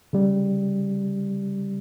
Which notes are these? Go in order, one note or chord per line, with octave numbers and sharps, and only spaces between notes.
C#3 G3